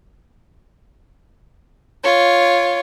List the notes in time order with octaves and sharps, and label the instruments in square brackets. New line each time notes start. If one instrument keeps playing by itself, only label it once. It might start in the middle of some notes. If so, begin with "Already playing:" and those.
[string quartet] F4 C#5